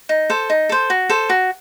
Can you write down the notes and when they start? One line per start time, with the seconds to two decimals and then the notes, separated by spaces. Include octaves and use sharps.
0.09 D#4
0.30 A4 C5
0.50 D#4
0.69 A4 C5
0.90 F#4
1.09 A4 C5
1.29 F#4